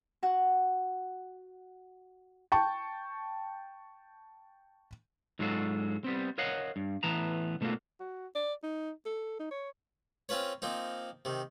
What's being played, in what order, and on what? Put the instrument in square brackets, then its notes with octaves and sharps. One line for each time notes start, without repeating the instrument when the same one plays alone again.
[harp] F#4 F#5
[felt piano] G5 A5 C#6
[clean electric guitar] G#2 F#3 G#3 F4 F#4 A4
G3 B3 C4
A#4 C#5 D#5 F5 F#5
G2
A2 E3 B3 A5 A#5
B2 A3 A#3 F4 F#4
[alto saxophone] F#4
D5
D#4
A4
D#4
C#5
[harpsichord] C4 C#4 F4 B4 C#5
F3 A#3 C4 D#4
C3 D#3